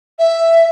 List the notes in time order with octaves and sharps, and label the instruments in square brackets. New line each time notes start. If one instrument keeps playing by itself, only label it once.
[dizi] E5